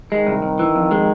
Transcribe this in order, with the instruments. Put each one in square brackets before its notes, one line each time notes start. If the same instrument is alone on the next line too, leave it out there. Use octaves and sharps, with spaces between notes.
[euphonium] D#3 [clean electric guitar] G#3
[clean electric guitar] C2
C2
E3
F2
G#3